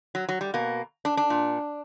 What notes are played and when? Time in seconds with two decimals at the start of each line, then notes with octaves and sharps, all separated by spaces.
0.15 F#3
0.29 F#3
0.41 G3
0.54 B2 A#3
1.05 D4
1.17 D4
1.30 A#2